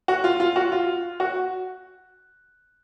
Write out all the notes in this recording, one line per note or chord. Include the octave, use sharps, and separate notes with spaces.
F#4
F4
F4
F#4
F4
F#4